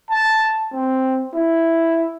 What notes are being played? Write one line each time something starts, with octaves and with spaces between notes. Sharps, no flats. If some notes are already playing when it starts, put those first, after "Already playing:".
A5
C4
E4